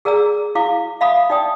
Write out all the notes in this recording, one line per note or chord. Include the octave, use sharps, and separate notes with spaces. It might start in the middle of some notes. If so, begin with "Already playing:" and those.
G#4 A#4 D5 A#5 E6
E4 F5 D6
E5 F5 B5 D6 D#6
D#4 D5 G5 D#6